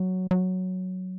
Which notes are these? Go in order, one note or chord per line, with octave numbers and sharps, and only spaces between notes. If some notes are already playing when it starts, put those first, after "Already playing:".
Already playing: F#3
F#3